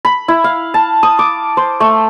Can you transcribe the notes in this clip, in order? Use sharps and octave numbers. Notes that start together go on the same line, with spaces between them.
B5
E4
F5
A5
D#6
D6
C5
A3